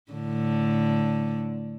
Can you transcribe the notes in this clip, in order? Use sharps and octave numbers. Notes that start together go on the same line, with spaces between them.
A2 D3